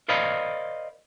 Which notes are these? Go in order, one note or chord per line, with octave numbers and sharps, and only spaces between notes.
A#4 C5 D5 D#5 F5 B5